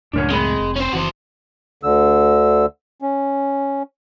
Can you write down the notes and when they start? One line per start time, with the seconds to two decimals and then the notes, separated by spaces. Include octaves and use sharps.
0.13 C#2 F#2 A2 D4 A#4 C#5
0.31 G#3 C4 B5
0.60 F1
0.76 C#4 C5
0.93 F#1 E3 F#4 C5
1.83 D2 D3 E6
3.02 C#4